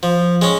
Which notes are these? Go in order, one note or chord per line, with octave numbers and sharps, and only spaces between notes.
F3
G#3 C#4